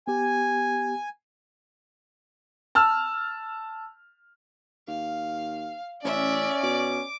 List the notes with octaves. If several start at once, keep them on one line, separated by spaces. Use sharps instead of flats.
B3 G4 G#5
A5 E6 F6
D#2 F5
A1 C#4 D5 E5
B2 D6